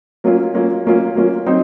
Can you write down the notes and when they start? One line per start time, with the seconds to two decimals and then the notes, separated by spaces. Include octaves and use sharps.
0.24 F#3 A#3 C#4 F4
0.54 F#3 A#3 C#4 F4
0.86 F#3 A#3 C#4 F4
1.15 F#3 A#3 C#4 F4
1.46 F#3 C4 D#4